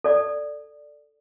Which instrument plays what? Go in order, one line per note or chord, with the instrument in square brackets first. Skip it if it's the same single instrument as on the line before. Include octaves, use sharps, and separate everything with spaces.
[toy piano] A4 D5